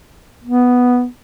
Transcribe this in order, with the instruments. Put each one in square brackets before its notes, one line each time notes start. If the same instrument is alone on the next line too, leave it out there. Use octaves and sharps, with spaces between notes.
[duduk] B3